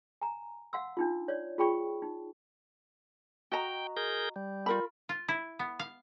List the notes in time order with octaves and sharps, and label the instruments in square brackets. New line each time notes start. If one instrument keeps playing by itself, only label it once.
[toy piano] G#5 A#5
F5 F#5 C6 E6
D4 D#4 F4
C#5 D5
F4 G#4 G5 B5 C#6
D#4
[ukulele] F#4 D#5 A#5 [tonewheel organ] G5
[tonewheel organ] G#4 A#4 G6
G3
[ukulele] F4 A#4 B5
[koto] F4
E4
B3
F5